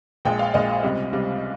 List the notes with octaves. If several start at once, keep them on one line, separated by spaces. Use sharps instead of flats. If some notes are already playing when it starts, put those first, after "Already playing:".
A#1 A#2 G#3 G5
F5
A#1 A#2 G#3 D#5
C#2 C3 G3
C#2 C3 G3